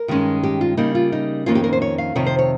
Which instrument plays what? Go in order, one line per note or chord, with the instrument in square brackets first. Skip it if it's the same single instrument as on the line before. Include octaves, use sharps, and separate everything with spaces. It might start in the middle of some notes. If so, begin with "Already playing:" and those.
Already playing: [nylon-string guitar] A#4
G2 D#3 G#3 C#4
G4
F4
C#3 G3 A#3 D#4
F4
D#4
F2 D#3 A#3 C#4 F4
G4
A#4
C5
C#5
F5
F2 C3 D#3 C#5
C5
C#5